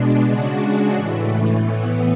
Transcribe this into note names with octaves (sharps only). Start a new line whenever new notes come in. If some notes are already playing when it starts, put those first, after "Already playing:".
Already playing: B2 G#3 D4
C#3 G#3 D4 F#4
A2 E3 A3
A2 E3 B3